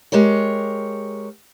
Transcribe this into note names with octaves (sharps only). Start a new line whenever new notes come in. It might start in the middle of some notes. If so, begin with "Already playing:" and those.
G#3 G4 A#4 C#5